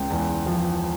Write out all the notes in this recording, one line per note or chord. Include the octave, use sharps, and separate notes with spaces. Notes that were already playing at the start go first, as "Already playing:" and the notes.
Already playing: C#2 G5
E2
F3